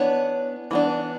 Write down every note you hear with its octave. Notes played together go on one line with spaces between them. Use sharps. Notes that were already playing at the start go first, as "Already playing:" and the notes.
Already playing: E3 B3 D4 C#5
E3 B3 D4